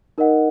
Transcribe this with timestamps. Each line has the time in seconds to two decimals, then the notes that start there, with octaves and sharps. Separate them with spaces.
0.18 D#4 A#4 D#5 F#5